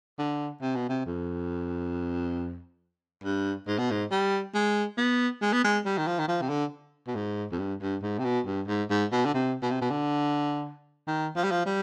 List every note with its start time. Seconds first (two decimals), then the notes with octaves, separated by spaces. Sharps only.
0.18 D3
0.62 C3
0.75 B2
0.89 C3
1.06 F2
3.23 G2
3.67 G#2
3.78 B2
3.91 G#2
4.11 G3
4.54 G#3
4.98 B3
5.42 G#3
5.53 B3
5.64 G#3
5.85 G3
5.98 D#3
6.07 F3
6.19 D#3
6.28 F3
6.42 C3
6.49 D3
7.07 B2
7.15 G#2
7.52 F2
7.59 G2
7.81 G2
8.02 G#2
8.19 C3
8.24 B2
8.46 G2
8.68 G#2
8.90 G#2
9.12 B2
9.25 D3
9.34 C3
9.62 B2
9.71 C3
9.81 B2
9.91 D3
11.07 D#3
11.36 F3
11.44 G3
11.51 F3
11.66 G3